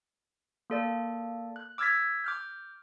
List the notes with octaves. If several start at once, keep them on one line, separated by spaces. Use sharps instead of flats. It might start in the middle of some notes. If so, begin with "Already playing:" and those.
A#3 A4 D5
F#6
D6 E6 F6 G#6 A6 B6
D6 F6 G6